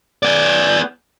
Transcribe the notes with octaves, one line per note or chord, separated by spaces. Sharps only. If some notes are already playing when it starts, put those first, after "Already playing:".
B3 D5